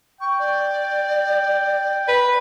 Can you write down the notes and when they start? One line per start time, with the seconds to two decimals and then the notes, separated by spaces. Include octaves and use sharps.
0.21 G5 C#6
0.39 D5
2.08 B4